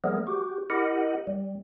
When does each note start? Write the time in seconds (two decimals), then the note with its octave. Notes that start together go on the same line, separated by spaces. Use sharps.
0.04 F3 G3 A3 B3 G#4 A#4
0.27 F#4 G4
0.70 E4 G4 A#4 D#5 F#5
1.27 G3